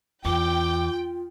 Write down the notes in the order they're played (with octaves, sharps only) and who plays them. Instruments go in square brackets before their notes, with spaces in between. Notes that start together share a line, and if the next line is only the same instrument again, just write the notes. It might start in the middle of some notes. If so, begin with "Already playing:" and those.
[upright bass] E2 [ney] F4 [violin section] G5 [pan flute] D6